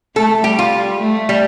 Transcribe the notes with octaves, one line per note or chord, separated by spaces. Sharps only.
A3 A4
G3 G4
F4
A3
G3